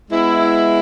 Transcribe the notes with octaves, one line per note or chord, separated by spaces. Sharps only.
G#3 B3 E4